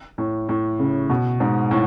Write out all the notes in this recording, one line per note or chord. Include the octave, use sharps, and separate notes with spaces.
A2
A2
C#3
B2
G#2
A2